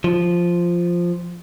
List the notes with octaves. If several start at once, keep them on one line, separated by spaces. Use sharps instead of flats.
F3